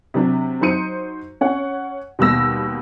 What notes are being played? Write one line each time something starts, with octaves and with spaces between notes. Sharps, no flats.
C3 F#3 D4
F#3 D#4 C5 C#7 D#7
C#4 C#5 F#5
D#2 B2 G3 E6 A#6